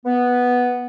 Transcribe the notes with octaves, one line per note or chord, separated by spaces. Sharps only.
B3